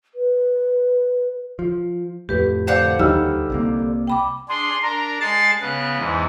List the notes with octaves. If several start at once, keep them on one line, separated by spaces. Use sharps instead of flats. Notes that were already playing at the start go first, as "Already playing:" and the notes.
B4
F3
F2 A2 G4 B4
D3 C5 F5 F#5 A5 G6
D#2 G3 D#4 E6 F6
C2 C3 A#3
G5 B5 D6
D4 G#4 C6
D4 A#4 A#5
G#3 A5 A6 C7
C#3 B3 F#6
E2 G#2